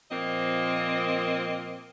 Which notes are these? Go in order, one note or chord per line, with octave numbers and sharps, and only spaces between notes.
A#2 F3 A#3 C4 D#5